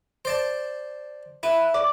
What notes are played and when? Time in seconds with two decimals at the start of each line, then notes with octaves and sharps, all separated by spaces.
0.25 C5 D5 A5
1.43 E4 B4
1.74 D5